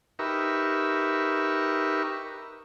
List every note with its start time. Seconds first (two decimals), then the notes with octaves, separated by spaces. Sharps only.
0.19 D#4 G4 A#4 B4 E5 C#6